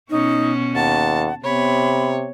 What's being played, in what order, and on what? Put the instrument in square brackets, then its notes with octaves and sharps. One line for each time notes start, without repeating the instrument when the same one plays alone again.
[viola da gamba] B2 C#4 F#4 [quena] D#4
[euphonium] D#2 [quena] F#5 [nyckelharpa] A5
[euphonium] C3 [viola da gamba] B3 [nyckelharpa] C#5 [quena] B5